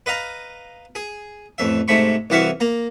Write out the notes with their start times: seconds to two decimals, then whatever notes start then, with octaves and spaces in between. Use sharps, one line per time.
0.06 B4 D#5 F5 A#5
0.95 G#4
1.58 A1 F2 E5
1.88 G#2 C3 A3 B5 C#6
2.30 C2 E3 F#4 E5 F5 C#6
2.60 A#3 A#5